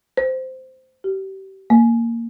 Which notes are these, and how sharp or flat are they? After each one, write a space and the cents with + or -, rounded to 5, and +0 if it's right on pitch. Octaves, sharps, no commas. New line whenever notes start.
C5 -10
G4 -30
A#3 -10